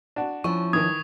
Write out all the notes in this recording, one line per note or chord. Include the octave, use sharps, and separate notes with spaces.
D4 F#4
F3 C#4 E4 C#6
D#3 E3 D#6 G#6